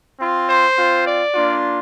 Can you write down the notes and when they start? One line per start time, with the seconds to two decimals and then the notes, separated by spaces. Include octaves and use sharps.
0.19 C4 F4
0.48 C5
0.77 C4 F4
1.06 D5
1.34 A#3 D4 F4